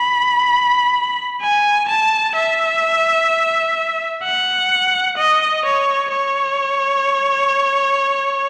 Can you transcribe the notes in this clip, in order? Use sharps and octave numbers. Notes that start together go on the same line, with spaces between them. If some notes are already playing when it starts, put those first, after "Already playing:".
Already playing: B5
G#5
A5
E5
F#5
D#5
C#5
C#5